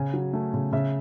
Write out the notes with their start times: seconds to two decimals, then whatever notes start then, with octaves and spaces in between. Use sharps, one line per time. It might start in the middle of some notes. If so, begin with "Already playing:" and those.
Already playing: C#3 G#5
0.14 F#3
0.33 A3
0.54 C#3
0.73 C#3 E5